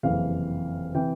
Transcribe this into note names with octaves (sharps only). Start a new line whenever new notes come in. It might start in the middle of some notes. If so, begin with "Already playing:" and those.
F#1 F2 C3 E3 F5
C3 E3 G5